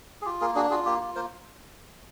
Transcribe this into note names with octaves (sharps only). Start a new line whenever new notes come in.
G#4
F4 G4
A#3 G#4 A#4
D4 F#4 G#4
F4 F#4 G#4
A#3 G4
F4
A#3 A#4 C5